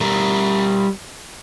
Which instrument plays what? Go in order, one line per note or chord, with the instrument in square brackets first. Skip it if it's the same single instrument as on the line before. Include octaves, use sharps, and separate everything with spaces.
[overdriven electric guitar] G3 A#4